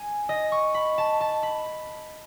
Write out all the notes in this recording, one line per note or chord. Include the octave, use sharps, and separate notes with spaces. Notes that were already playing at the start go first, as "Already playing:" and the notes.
Already playing: G#5
D#5
C#6
B5
A5
A5
B5